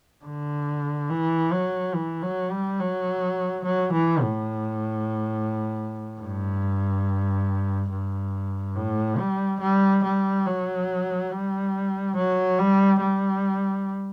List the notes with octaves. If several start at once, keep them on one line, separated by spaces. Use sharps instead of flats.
D3
E3
F#3
E3
F#3
G3
F#3
F#3
E3
A2
G2
G2
A2
G3
G3
G3
F#3
G3
F#3
G3
G3